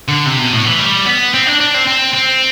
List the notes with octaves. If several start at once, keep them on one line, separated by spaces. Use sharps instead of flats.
D3
C3
B2
A2
E3
G3
B3
C4
D4
D4
C4
C4
C4